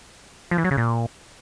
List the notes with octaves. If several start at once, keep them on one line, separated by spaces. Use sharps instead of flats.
F3
E3
F#3
C#3
A#2